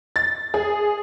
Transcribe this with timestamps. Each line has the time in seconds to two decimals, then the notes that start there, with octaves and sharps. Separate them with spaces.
0.16 A6
0.54 G#4